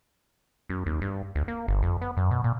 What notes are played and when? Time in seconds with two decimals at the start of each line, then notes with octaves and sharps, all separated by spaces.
0.70 F#2
0.86 D#2
1.01 G2
1.35 D2
1.48 A#3
1.68 G1
1.83 F2
2.02 B3
2.17 F#2
2.31 B2
2.44 A#2